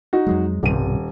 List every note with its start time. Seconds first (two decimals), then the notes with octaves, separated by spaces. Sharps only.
0.13 D#4 F#4
0.27 F2 F#3 G#3
0.63 D#1 B1 G2 C3 D#7